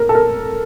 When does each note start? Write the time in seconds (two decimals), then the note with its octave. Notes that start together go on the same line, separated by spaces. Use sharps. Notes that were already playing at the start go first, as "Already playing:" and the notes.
Already playing: A#4
0.09 A4
0.15 A#4